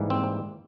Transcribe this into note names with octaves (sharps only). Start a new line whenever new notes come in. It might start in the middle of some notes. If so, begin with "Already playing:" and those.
Already playing: G#2 E3 G3 A#3
C4